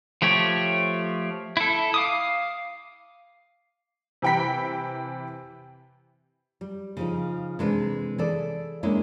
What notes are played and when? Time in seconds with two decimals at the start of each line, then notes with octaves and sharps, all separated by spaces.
0.22 F3 A3 G4 C#5
1.57 E4 A4
1.94 F5 D6 D#6
4.22 C3 E3 G5 B5 B6
6.61 G3
6.97 C#3 F3 D#4
7.59 C3 E3 G#3 D4 A4 B4
8.18 E3 G#4 A4 D5
8.83 G#3 A#3 C#4 D4 E4